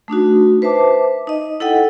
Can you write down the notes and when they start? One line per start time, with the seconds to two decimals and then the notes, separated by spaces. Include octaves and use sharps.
0.08 A3 D4 D#4 F#4
0.62 B4 C5 E5 A5 D6
1.27 D#4 D#5
1.60 E4 A4 D#5 F#5 G5